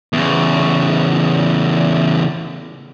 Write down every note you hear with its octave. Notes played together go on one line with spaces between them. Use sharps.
E2 C#3